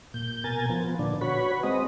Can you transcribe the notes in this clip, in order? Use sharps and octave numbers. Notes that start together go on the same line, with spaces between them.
A#2 G6
B2 A#4 G#5 A6
F3 B3
A#2 D3 D4
F#4 B4 C#5 B5
G#3 C4 D#5